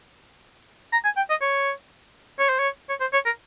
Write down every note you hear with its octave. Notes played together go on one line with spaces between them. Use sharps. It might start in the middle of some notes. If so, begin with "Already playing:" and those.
A#5
G#5
G5
D#5
C#5
C#5
C5
C#5
C#5
C5
C#5
A#4